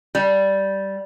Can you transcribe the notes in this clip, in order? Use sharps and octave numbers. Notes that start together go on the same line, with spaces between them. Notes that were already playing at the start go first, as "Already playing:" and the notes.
G3